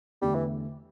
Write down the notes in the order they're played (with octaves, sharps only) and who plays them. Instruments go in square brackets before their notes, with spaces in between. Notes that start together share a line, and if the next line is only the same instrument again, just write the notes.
[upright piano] E2 D3 A3 [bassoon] G3
[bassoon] E3